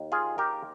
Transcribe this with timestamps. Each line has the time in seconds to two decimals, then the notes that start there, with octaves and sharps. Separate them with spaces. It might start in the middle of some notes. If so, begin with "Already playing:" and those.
Already playing: D#2 D#3
0.12 F4 G#4
0.38 G4 A#4